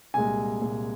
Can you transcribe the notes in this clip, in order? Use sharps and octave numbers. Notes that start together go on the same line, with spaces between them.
C2 A#2 G#3 G#5
C2 A#2 G#3